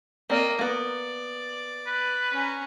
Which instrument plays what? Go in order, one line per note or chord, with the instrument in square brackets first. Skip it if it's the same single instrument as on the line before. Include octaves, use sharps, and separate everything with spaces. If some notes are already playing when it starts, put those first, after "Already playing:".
[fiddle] A#3 D#5 [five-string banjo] C4 D5
[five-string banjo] A#3 B3 [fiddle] D5
[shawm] B4
[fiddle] C#4 A#5